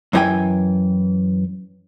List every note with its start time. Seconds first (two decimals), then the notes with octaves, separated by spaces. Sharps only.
0.13 F#2 E3 D4 G#4 G5 G#5